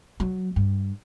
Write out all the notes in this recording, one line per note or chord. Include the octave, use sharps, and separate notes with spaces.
F#3
G2